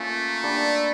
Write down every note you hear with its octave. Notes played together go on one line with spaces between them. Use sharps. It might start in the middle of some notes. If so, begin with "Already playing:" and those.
Already playing: A3 A#3 C#4 F4
G3 A#3 D4